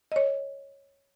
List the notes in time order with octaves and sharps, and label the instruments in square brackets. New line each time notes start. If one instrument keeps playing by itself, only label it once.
[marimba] C#5 D#5